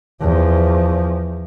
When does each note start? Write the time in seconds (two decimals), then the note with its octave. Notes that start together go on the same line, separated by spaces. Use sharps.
0.21 E2 F3